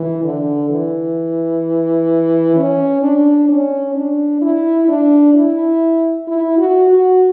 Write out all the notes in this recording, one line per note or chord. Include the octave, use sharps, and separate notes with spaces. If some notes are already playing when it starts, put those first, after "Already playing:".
Already playing: E3
D3
E3
C#4
D4
C#4
D4
E4
D4
E4
E4
F#4
F#4